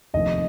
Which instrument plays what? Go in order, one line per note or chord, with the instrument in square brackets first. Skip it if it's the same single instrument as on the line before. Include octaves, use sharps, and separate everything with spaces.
[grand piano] F1 D#2 D#3 D#5